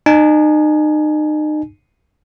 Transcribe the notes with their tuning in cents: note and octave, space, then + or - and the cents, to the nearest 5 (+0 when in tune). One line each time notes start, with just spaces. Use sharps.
D#4 -35 G#5 +20